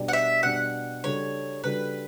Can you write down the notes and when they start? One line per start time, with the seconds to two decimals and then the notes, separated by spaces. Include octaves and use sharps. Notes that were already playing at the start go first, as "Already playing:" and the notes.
Already playing: B2 G3 D4 G4 D5
0.08 F#5
0.13 E5
0.43 B2 G3 D4 G4 D5 F#5
1.03 C#3 G3 D4 F#4 A4 C#5
1.63 C#3 G3 D4 F#4 A4 B4